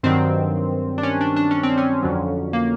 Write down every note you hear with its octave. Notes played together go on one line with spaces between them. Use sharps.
G2 D#3 F#3 C4
D4
C#4
D4
D4
C#4
C4
C#4
F2 D3 F#3
A#3